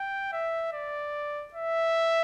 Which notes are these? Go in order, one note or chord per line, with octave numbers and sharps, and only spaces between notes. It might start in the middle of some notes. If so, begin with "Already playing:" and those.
Already playing: G5
E5
D5
E5